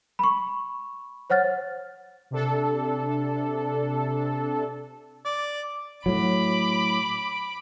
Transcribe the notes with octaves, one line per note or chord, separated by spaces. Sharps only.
B5 C#6
C5 C#5 F#5 F6 A6
C3 D4 A4
D5
A2 F#3 B5 D6